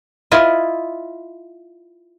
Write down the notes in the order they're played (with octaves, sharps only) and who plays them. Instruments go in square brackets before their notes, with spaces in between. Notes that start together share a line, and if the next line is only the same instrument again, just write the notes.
[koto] E4 F4 D#5